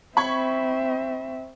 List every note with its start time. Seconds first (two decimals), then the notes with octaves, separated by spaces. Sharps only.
0.17 C4 E5 B5 C#6 G#6